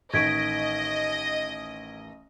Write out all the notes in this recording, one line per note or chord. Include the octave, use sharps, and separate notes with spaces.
A1 D#3 D#5 C#6 G#6 B6 D7